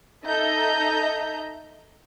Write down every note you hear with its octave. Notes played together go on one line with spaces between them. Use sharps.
D#4 A4 D#5 E5 A#5 G6